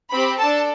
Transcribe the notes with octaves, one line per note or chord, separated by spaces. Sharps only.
C4 G4 B5
D4 A4 A5